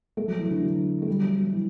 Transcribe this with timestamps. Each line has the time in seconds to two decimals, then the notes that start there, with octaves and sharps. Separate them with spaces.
0.17 A3
0.28 F#3
0.39 E3
0.51 D3
0.62 F#3
1.02 A3
1.08 G3
1.23 F#3
1.38 F#3
1.53 E3